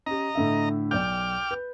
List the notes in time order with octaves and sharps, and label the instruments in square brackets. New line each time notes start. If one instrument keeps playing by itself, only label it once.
[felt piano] C#4 G4 [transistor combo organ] D#5 A#5
[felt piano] A2 D3 E5
[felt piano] B1 D5 G6 [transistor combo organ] G5 D6 F6
[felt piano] B4